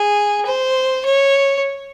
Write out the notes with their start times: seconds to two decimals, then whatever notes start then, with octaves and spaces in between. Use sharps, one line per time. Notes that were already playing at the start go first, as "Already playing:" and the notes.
Already playing: G#4
0.46 C5
1.05 C#5